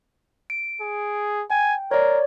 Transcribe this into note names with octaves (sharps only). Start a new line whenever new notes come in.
D7
G#4
G5 G#5
A#4 C#5 D5